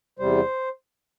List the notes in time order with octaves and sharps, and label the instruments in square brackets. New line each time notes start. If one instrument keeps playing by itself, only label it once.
[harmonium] E2 C3 G3 C5